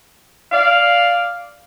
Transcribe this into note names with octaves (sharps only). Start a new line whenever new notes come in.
D5 F5